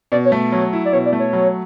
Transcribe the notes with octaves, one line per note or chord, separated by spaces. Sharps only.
B2 D5
C#5
A3
F#3 C#5
E4
D5
B2 C#5
D5
A3
C#5
F#3